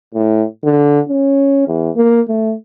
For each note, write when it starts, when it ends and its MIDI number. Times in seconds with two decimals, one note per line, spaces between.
0.14 0.45 45
0.64 1.00 50
1.09 1.65 61
1.67 1.90 40
1.96 2.21 58
2.28 2.54 57